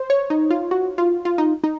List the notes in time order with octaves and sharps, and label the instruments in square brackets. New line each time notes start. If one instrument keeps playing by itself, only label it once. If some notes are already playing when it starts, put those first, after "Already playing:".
Already playing: [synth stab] C5
C#5
D#4
F4
F#4
F4
F4
D#4
D#4